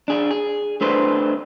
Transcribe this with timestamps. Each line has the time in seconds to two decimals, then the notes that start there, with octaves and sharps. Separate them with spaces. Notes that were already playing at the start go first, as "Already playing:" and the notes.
0.08 D4 G#4
0.31 G#4
0.81 A3 D4 B4 C5